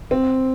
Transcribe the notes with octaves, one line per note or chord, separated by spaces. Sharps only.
C4